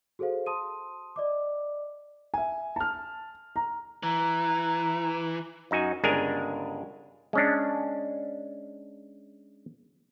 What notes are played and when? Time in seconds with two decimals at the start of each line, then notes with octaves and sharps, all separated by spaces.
0.19 F#4 G#4 A4 C5 F5
0.46 A5 C6 D#6 D#7
1.16 D5 D#5 D6
2.34 E5 G#5
2.76 A5 F6
3.56 A#5
4.03 E3 A#5
5.71 F#2 D#4 F#4 G#5
6.03 G1 C#3 G#3 D4 A#4 G#5
7.33 G#3 C#4 D4